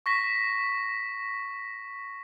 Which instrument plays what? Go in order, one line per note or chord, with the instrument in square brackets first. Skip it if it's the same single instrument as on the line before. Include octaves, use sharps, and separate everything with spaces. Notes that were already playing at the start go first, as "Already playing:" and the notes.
[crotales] C#6 A#6 B6